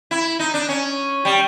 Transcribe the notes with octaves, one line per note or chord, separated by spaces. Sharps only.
E4
D#4
D4
C#4
G3